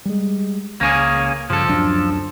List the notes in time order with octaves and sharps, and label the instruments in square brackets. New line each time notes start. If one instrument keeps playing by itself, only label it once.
[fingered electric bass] G3 G#3
[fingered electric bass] C#2 [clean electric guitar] A#3 C#4 G#4
[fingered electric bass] G2 C#3 [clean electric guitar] F3 A4
[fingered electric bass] D1 F#2 D4